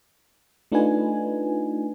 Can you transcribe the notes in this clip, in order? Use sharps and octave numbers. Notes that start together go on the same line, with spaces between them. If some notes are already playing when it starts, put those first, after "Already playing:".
A3 D4 D#4 F4 B4 G#5